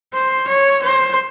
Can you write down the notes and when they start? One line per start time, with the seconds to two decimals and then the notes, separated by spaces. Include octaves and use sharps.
0.13 C5
0.48 C#5
0.83 C5